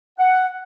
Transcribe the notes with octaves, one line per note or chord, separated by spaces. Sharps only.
F#5